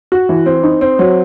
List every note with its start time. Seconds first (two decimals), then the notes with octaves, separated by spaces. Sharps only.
0.12 F#4
0.29 E3
0.46 C4
0.63 D#4
0.81 C4
0.99 F#3